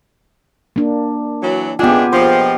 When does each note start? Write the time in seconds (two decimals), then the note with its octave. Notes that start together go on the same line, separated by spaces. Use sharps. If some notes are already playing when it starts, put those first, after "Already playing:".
0.76 A#3 D4
1.43 E3 F#3
1.79 C#3 G#3 B3 D4 F4 G4 G#5
2.13 A#2 F3 C5 D#5